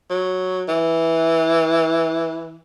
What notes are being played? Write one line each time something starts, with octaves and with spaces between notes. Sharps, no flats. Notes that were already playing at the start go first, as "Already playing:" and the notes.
F#3
E3